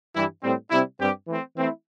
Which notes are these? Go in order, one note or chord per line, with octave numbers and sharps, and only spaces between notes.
G2 E3 G3 E4
A2 G3 C4
C3 G3 C4 E4
G2 G3 C4 G4
E3 A3 C4
E3 A3 C4 E4